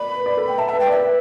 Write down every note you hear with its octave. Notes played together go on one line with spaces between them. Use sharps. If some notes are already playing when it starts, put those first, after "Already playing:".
Already playing: D5 B5
B4
D5
A4
G5
E5 A5
B4 E5
G5
D5
E5
B4